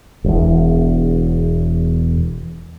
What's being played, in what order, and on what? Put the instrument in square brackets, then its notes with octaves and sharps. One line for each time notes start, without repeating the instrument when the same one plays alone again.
[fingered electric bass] E1 E2